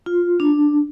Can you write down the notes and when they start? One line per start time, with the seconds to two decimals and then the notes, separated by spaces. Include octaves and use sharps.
0.06 F4
0.40 D4